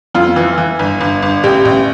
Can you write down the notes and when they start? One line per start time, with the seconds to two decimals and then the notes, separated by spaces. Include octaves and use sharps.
0.14 F2 F4
0.36 E3
0.58 E3
0.79 G1
1.00 G1
1.22 G1
1.43 A1 G4
1.65 A1